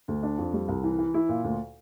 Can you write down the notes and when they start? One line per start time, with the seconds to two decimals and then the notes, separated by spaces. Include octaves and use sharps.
0.08 D2
0.23 D4
0.38 F2
0.53 G3
0.68 C2
0.83 E3
0.98 E3
1.14 E4
1.29 A#2
1.44 D2